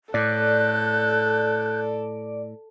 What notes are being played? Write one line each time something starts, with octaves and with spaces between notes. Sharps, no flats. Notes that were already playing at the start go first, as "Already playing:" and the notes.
A2 A4 D5 F#6 G6